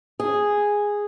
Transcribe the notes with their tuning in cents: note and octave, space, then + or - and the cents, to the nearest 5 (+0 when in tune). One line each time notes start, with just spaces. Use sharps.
G#4 -5